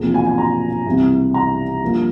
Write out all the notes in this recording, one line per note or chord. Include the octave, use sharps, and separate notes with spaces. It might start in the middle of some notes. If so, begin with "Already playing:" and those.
Already playing: E1 E2 C3 F3 A#3
G#5
G#5
A#5
C2 C3 E3
A#5
G2 F3 A#3